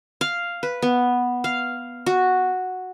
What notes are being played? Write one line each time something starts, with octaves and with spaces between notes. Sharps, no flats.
F5
B4
B3
F5
F#4